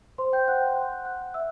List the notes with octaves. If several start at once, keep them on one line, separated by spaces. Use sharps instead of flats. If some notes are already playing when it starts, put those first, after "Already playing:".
C5 C6
G5 G6
F#5 F#6
F#5 F#6
E5 E6